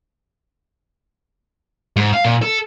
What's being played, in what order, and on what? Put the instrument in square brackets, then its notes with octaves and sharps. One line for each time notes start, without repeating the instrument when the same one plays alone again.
[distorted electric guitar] G#2
F5
A#2
A4